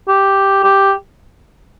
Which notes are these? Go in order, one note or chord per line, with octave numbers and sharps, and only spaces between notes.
G4
G4